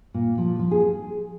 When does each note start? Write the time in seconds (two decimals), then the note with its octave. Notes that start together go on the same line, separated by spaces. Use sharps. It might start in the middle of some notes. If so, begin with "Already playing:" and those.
0.14 A#2
0.38 F3
0.59 F3
0.71 G#4